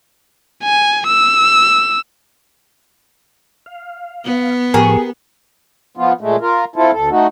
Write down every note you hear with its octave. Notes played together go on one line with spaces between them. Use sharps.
G#5
E6
F5
B3
A2 F3 G4 G#4 A#4 C#6
F3 B3 F4
A#2 G#3 A3
F4 A#4
C4 E4 F4 A4
D2 A4
A3 D#4 F#4